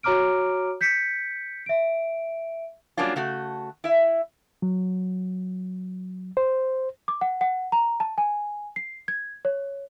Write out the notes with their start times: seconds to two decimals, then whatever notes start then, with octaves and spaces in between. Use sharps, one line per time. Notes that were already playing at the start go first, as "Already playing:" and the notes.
0.03 F#4 C#5 A#5 D6 F6 D7
0.81 G6 B6 C#7
1.66 E5 D7
2.97 F#3 G3 A#3 C#4 D4 F4
3.16 C#3 A3 F#4
3.84 E4 E5
4.62 F#3
6.37 C5
7.08 D6
7.21 F#5
7.41 F#5
7.72 A#5
8.00 A5
8.18 G#5
8.76 C7
9.08 G#6
9.45 C#5